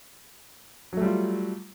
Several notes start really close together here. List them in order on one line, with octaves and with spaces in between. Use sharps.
F#3 A3 G3 F4